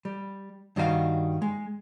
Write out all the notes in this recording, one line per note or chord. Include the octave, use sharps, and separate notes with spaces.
G3
G2 D#3 G3 F#4 G#4 F5
G#3